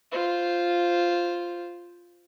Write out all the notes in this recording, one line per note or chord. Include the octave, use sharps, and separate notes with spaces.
F4 C5